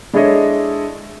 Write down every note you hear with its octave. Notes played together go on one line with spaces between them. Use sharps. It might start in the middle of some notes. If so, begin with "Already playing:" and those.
G#3 D4 E4 A4 C#5 D#5